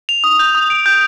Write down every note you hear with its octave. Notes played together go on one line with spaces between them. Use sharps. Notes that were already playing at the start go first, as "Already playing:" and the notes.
F7
D#6
G6
D#6
D7
G6